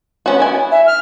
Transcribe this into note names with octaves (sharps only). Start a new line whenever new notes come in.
B3 C#4 F#4
E4 G#5
E5
F6